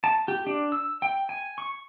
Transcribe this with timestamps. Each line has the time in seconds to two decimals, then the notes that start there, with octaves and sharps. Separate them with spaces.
0.04 A5
0.28 G4
0.47 D4
0.72 E6
1.02 G5
1.29 G#5
1.58 C#6